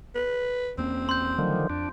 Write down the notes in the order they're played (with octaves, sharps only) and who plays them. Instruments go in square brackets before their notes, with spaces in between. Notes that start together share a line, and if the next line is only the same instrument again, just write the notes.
[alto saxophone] B4
[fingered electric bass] E2 A#3 C#4 [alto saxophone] C4
[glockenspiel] C6 G6
[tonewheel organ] D3 D#3 F3 [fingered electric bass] F#3 A3
[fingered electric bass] F2 [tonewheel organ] D4